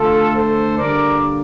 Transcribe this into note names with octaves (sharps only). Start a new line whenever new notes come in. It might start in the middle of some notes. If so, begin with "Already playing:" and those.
Already playing: D3 A3 F4 A4
A4 C5
D3 G3 A#3 A#4 D5